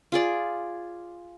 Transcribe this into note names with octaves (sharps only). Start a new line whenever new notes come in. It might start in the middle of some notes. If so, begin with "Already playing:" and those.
F4 G#4 D5